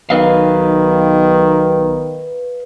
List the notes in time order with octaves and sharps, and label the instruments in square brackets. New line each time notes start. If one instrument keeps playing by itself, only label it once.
[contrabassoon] B1 [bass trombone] D#3 [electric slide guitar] B4 D#5 F5